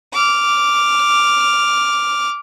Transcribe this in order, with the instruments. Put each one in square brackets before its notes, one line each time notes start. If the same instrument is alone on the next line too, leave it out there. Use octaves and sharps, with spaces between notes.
[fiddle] D6 F6